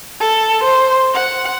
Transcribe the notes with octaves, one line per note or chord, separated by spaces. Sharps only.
A4
C5
F#5